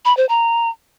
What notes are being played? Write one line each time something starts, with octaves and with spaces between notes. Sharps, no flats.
B5
C5
A#5